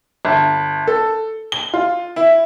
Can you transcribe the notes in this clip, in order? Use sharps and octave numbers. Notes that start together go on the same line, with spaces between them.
G1
A4
G7
F4
E4